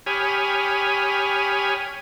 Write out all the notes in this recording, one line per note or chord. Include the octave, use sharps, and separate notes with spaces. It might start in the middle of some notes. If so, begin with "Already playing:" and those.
G4 C#5 G#5 B5 D#6 F6